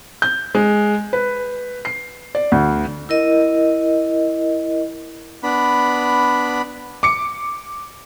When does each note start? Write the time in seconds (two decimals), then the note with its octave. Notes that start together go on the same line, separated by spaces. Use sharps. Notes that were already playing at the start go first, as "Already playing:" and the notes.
0.22 G6
0.55 G#3
1.13 B4
1.85 C7
2.35 D5
2.52 D2
3.09 E4 A#4 D#5
5.43 B3 D4 B5
7.03 D6 C#7